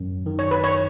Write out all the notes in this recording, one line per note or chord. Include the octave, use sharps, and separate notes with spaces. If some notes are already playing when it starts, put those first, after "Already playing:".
Already playing: G#1 F#2
D#3
C#5
B4
C#5